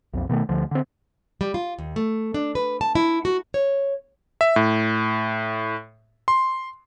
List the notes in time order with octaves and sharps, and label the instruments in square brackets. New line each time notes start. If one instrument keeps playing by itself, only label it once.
[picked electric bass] B1 F2
B2 D#3 G#3 A3
D2 D3 F3
D3 C4
[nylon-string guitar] G3
F4
D#2
A3
D4
B4
A5
E4
F#4
C#5
[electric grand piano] E5
A2
C6